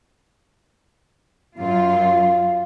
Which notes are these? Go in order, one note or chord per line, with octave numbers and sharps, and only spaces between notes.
F#2 F4 F5